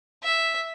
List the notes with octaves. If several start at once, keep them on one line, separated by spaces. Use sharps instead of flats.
E5